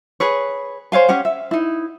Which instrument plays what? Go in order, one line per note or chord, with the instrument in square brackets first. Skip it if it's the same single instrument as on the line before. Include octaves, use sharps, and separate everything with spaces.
[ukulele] G#4 B4 C#5
C5 C#5 F5 G#5
C#4 G4 C#5 F#5
E5
D#4 E4